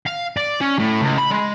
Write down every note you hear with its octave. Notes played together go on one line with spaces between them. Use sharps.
F5
D5
C#4
A2
C#2
B5
G#3